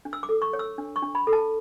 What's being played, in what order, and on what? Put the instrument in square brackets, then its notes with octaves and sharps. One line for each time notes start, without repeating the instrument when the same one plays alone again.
[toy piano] D4
E6
D6
A4
C#6
C#5
E6
D4
C#6
D4
B5
A4
A5